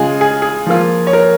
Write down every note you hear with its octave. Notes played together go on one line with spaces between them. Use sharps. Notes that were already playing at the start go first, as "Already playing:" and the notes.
Already playing: C#3 G#3 F4 G#4
G#4
G#4
F3 A#3 F4
C#5
A#4